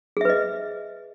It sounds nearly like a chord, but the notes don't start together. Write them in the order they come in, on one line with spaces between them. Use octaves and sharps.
G#4 E5 B4 D#5